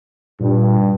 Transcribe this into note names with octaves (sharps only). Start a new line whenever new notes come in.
G2 A#2